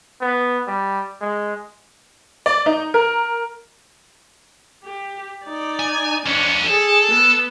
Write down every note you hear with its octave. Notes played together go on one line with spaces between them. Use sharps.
B3
G3
G#3
D5
D#4
A#4
G4
D#4 D5
G#5
F2 C#4 D4
G#4 A4
B3